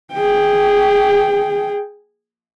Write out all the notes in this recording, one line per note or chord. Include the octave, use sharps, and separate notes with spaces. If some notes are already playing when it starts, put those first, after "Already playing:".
G#4 G5